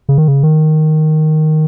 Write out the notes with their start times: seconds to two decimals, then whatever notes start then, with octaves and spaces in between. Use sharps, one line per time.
0.09 C#3
0.18 D#3
0.28 C#3
0.43 D#3